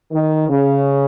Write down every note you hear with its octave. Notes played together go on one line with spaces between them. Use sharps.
D#3
C#3